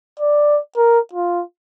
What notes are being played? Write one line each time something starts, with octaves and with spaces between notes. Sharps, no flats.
D5
A#4
F4